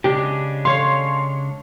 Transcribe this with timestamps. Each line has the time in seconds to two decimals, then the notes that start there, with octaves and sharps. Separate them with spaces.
0.04 C#3 G#3 D4 G4
0.65 C#5 F5 C6